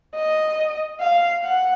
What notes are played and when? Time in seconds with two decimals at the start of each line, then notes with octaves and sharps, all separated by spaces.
0.16 D#5
1.01 F5
1.44 F#5